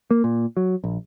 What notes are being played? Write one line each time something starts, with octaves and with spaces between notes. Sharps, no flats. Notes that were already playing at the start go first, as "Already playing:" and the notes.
A#3
A#2
F#3
A#1